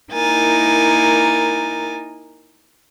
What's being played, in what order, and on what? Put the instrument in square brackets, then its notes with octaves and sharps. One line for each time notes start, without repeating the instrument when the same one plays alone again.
[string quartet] A#3 D#4 E4 A#4 G#5 A6